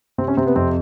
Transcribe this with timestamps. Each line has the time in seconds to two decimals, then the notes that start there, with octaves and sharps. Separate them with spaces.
0.18 C3 C4
0.28 C#4
0.37 C3 C4
0.47 B3
0.56 F2 C4